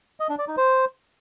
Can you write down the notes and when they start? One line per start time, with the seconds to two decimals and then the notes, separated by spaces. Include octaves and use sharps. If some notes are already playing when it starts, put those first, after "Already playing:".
0.20 D#5
0.29 D4
0.39 D5
0.48 D#4
0.57 C5